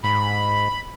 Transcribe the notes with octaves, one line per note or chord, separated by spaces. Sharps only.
G#2 B5